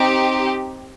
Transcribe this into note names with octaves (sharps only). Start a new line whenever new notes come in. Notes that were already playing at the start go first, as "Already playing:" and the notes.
Already playing: C4 D#4 G4